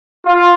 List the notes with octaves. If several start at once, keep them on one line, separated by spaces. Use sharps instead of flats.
F4